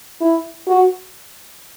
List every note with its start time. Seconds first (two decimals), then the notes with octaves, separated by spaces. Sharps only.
0.21 E4
0.68 F#4